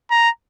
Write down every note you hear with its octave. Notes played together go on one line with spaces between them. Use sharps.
A#5